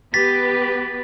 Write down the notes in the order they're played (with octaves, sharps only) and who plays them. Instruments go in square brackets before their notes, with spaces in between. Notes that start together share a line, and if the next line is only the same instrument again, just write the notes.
[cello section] B3 G4 B4 [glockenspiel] A6 B6